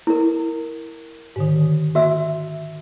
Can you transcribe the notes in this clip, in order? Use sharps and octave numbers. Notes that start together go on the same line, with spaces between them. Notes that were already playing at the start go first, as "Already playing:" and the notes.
E4 A#4
G#2 D3 D#3
F#4 E5 E6